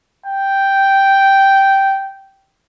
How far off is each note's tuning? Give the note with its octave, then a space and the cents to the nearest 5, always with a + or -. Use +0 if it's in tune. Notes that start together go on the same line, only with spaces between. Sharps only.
G5 -5